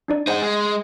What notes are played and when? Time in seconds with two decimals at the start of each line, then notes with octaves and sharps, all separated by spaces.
0.08 D4 D#4 D5
0.27 D#4 G#4 C5 F#5
0.42 G#3